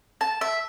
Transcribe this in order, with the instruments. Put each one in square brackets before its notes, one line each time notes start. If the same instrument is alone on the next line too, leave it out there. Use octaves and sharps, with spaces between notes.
[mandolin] A5
E5